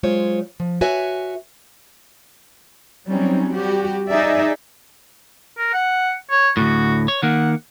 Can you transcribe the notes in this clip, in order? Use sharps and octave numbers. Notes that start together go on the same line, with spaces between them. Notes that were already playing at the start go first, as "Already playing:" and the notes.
F#3 G#3 F4 C5 C#5
F3
F#4 B4 C#5 E5 G#5
F#3 G3 C4 C#4 D#4
G3 F#4 G4
D#4 G#4 D5 E5
A#4
F#5
C#5
D2 A2 F#4
C#5
D#3 A#3 F#5